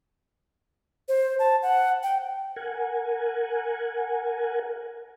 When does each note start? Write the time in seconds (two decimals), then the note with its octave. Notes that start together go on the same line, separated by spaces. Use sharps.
1.09 C5
1.39 A5
1.62 F#5
2.03 G5
2.56 A#4 F#5 G#5